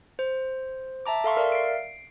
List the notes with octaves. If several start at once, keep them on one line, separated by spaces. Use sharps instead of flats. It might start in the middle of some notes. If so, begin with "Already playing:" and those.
C5
E5 A5 A#5 D6
A4 E5 F5 C6 C#6
A#4 D5 E5 F5
C7 D7